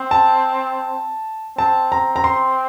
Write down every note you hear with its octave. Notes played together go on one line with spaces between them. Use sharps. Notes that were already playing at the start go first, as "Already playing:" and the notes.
Already playing: C4
A5
C4 A5
A#5
A#5
C6